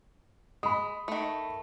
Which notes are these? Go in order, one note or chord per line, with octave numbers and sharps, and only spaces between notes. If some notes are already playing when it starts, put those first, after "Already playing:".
G#3 B5 D#6
D#3 A3